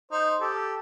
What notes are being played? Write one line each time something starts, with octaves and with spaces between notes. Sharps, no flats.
D#4 C5
G4 A4